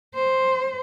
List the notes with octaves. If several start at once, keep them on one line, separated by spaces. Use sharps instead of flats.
C5